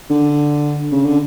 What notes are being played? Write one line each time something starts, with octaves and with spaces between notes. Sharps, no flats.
D3
C#3
D3